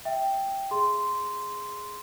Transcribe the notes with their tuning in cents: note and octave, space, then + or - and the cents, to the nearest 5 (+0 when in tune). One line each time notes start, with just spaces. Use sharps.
E5 +0 G5 +0
G#4 +0 C6 -10